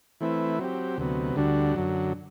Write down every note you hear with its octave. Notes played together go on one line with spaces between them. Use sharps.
E3 A3 C4 E4 B4
F#3 C4 G4
D2 C3 F#3 B3
D2 D3 G3 D4 F#4
F#2 D3 F#3